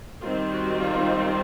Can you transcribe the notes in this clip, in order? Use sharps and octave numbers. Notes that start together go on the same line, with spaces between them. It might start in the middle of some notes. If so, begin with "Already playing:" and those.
D#3 G3 C4 F4
F#4
F4